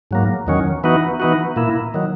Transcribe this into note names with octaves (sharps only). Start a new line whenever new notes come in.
G#2 F#3 A#3
E2 D#3 F#3 C#4
E3 B3 D#4 F#4
E3 B3 D#4 F#4
A#2 A#3 E4
D#3 F#3